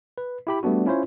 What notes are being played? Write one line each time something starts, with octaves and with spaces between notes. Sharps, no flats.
B4
E4 G4 B5
G3 A3 B3 D4 F#4
C#4 E4 F4 C5 C#5